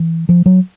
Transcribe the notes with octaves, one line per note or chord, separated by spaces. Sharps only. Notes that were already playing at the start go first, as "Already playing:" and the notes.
Already playing: E3
F3
F#3